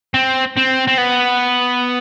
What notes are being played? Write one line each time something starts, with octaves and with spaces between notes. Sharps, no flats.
C4
C4
C4
B3